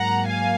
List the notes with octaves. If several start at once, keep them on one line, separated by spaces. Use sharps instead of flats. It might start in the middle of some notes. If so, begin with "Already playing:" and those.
Already playing: G#2 F#3 A#3 F#5 A#5
F5 G#5